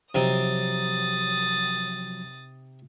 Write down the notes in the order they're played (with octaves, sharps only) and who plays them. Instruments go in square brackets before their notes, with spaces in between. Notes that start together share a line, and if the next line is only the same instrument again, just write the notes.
[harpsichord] C3 C4 D#4 [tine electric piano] F3 F#3 [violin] D#6 A6